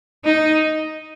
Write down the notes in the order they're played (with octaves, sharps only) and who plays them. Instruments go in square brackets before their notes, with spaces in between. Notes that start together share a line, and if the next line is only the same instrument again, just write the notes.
[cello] D#4